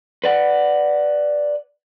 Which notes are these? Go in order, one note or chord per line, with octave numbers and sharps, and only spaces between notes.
B4 D5 F#5